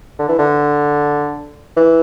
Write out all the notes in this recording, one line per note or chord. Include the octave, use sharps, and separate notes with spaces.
D3
E3
D3
E3